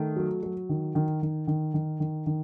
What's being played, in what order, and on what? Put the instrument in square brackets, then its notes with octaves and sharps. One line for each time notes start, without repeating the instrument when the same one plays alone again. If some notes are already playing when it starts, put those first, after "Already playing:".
Already playing: [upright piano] D#3 A3
F#3
F#3
D#3
D#3
D#3
D#3
D#3
D#3
D#3